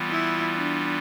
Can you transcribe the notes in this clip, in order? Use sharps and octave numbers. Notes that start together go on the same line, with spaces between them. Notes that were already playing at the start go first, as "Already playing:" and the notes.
Already playing: E3 G3 B3 F4
E4
D4